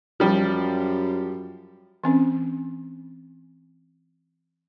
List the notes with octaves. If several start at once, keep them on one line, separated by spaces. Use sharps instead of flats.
F#2 F3 G3
E3 C4 C#4